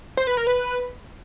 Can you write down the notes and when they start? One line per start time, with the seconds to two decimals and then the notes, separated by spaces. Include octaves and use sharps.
0.17 C5
0.27 B4
0.37 A#4
0.47 B4